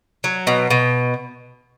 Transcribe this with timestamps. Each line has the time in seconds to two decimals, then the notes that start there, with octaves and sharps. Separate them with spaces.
0.24 F#3
0.47 B2
0.70 B2